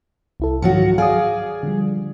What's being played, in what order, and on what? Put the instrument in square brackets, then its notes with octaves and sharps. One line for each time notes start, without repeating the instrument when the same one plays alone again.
[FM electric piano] C2 E4 A4
[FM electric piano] G#2 D#3 [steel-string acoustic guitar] F3 F#3 F#4
[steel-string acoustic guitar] G#4 D5 [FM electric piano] F5 D#6
[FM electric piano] D3 F3 G3